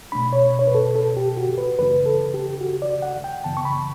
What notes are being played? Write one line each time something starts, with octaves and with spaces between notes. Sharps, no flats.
B2 A3 D4 B5
C#5
C#5
B4
A4
A4
G4
F#4
B4
F#2 C#3 E3 A3 D4 B4
A4
G4
F#4
D5
F#5
G5
F#2 C#3 E3 B3 A5
C#6
B5